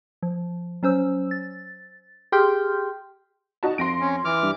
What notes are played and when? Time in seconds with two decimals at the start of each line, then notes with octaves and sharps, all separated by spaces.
0.23 F3
0.83 F#3 C#4 C5 E6
1.31 A6
2.32 G4 G#4 G5 C6 F6 G6
3.63 D#4 F#4 A5
3.78 F2 C6 A#6 D7
4.00 C#4
4.25 E3 D6 F6
4.43 G2